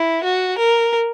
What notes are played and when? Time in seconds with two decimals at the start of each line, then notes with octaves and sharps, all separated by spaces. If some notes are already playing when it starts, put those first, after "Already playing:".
Already playing: E4
0.23 F#4
0.58 A#4